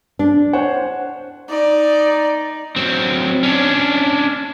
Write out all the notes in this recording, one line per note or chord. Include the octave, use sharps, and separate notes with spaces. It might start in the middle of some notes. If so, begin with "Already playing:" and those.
D4
C5 C#5 F#5
D#4 D5
F#3 C4
C#4 D4